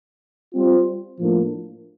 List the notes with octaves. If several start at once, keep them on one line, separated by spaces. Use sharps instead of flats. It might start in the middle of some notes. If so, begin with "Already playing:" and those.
G3 C4 F4 C5
A2 F3 A#3 D4